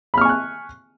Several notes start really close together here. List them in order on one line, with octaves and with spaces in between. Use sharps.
B5 F6 C#6 G#5 F#6